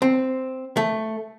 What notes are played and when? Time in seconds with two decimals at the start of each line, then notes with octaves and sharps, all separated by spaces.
0.02 C4
0.77 A3